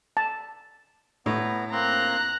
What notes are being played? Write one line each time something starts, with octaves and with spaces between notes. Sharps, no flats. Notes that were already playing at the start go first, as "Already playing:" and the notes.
A5
A2 B3 A#5
A#3 C4 A#5 C6 F#6